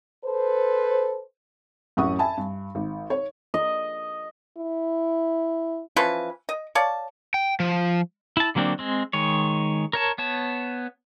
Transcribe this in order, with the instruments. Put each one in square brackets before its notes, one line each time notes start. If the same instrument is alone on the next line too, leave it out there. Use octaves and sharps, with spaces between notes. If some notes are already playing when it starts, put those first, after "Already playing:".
[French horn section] A4 B4 C5
[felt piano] A1 F#2 C#4 F#5 C#6 D#6
E5 G#5 A5 B5
G2
G#1
C#5
[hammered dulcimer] D#5
[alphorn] E4
[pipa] E3 F3 C#4 B4
D#5
C#5 D5 F5 A5
[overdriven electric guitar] G5
F3
[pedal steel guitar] E4 A5
D3 F#3 A#3 C4 D4
G#3 C4
D#3 G#3 C#5
A#4 C#5 A5
B3 C#5 A5